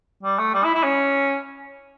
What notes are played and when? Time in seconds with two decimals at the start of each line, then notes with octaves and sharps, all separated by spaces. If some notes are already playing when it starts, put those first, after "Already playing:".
0.23 G3
0.39 A3
0.54 G3
0.64 E4
0.75 E4
0.84 C#4